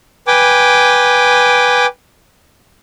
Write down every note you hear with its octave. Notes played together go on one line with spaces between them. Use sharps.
B4 G5 G#5 D6